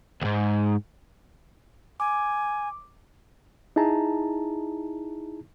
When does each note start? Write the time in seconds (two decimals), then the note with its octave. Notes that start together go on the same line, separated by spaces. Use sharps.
0.22 D#2 G#2
2.00 G#5 D6
3.76 D#4 E4 G#4 A5 A#5